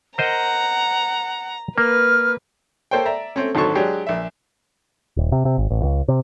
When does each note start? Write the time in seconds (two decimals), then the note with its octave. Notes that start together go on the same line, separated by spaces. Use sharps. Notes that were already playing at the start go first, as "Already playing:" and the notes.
0.18 A#4 C5 D#5 F#5 A#5
1.78 A#3 B4 F6
2.91 A#3 A4 C5 C#5 G5
3.05 D5 E5 A#5
3.36 A3 C4 C#4
3.55 G#1 G#2 D3 F#3 A5 C#6
3.75 F#3 G#3 D4 G4 G#4
4.07 A#1 E5
5.17 D#1
5.32 C3
5.45 C3
5.58 G#1
5.70 A1
5.83 C#2
6.08 C3